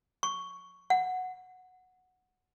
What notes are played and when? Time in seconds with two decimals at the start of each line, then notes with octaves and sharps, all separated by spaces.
0.23 C#6
0.90 F#5